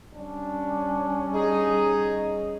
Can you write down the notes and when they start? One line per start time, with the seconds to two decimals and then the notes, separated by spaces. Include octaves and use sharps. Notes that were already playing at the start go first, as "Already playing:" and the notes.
0.15 G3 C#4 D4
1.34 D#4 G#4